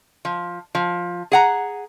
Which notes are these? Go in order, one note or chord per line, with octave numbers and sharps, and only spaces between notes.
F3
F3
G#4 F#5 A#5